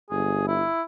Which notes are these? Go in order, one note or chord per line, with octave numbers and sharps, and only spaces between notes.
G1 G#4
E4